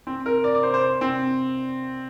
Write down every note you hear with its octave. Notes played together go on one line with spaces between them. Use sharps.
C4
A#4
D5
D5
C5
C5
C4